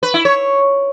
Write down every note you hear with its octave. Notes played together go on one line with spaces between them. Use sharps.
B4
E4
C#5